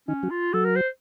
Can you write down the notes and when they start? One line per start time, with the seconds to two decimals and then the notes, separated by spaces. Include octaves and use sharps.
0.08 D#3 C#4 D#4
0.23 F#3 F#4
0.31 F4
0.53 F#3 F#4 A4
0.65 A#4
0.76 C5